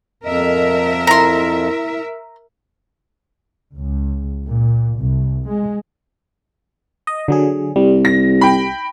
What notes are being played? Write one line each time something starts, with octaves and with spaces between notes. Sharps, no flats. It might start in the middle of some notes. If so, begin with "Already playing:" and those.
F2 A#4 D#5 E5
E4 A#5 C6
C#2
A#2
C2
G#3
D#5
D3 F#3 G#4
C2 G3
A#6
G5 B5